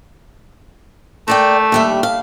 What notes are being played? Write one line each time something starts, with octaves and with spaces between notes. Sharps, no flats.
A3 A#4 D5 G5
D#2 G3 E5
F5